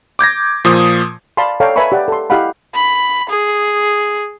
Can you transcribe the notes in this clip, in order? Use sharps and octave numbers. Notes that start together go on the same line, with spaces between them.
D6 G6 G#6 A#6
A#2 F3 D#6
D5 F5 A5 B5 C6
A4 C#5 D5 F5 G5 A#5
B4 E5 G#5 A#5 B5 C#6
G4 D5 F#5
A4 C6
E4 G4 D#5 F5 F#5 B5
B5
G#4